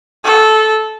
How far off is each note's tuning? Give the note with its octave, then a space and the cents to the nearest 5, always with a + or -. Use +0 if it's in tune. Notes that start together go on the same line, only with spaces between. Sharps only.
A4 -15